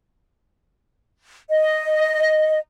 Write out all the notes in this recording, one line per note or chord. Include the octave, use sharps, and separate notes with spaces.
D#5